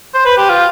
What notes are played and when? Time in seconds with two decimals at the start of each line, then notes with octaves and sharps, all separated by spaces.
0.14 C5
0.25 B4
0.37 G4
0.50 F4